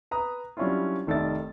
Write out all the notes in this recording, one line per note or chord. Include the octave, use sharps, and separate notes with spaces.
B4 A#5 D#6
F#3 G3 C#4 D4 E4 F4
F1 D#3 A4 D5 E5 A6